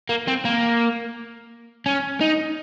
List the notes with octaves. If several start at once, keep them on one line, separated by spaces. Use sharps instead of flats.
A#3
C4
A#3
C#4
D#4